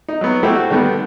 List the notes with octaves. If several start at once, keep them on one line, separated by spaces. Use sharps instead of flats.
D#4
F#3 B3
A3 C4 E4 F#4 G4 A4
F#4
D3 D#3 G3 A3 B3